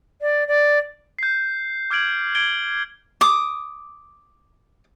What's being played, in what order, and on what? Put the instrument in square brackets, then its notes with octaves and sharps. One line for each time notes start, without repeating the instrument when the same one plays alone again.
[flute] D5
D5
[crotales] G6 C7
D6 F6 G#6 D7 F#7
G#6 D7 G7
[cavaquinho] D6 D#6